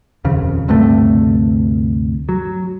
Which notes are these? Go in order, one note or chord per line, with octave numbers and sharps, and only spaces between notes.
D#1 F2 C#3
D2 G2 C3 A3
F#3